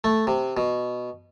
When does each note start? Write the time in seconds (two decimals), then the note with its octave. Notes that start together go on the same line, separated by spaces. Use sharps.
0.04 A3
0.27 C3
0.57 B2